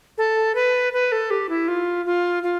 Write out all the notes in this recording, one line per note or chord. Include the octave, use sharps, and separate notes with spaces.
A4
B4
B4
A4
G4
E4
F4
F4
F4